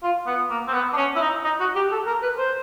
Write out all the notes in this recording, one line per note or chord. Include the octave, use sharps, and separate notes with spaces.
F4
B3
A#3
C4
B3
D4
C#4
E4
D#4
D#4
F#4
G4
A4
A#4
B4
C5